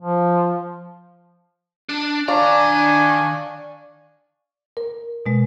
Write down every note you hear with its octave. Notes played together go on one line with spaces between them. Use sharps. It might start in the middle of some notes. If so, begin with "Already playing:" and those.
F3
D4
D#3 D4 D5 F5 G#5 A#5 C#6
A#4
B2 G#3